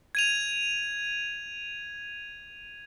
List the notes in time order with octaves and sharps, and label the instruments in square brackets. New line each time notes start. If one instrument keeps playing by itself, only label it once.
[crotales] G#6 D#7 F7